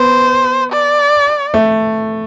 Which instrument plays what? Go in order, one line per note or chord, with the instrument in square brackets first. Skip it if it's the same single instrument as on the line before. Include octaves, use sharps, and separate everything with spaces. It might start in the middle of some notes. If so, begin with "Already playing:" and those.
Already playing: [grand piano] B3 [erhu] C5
[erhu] D5
[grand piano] A3